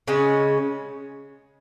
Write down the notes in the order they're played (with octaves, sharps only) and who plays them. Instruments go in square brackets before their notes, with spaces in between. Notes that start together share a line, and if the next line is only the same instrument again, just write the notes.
[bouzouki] C#3 G#3 C#4